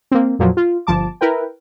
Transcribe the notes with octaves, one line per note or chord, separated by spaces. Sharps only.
A#3 C4
F2 A#2 F3 F#3
F4
G1 F3 A5 D6
E4 A#4 B4 G5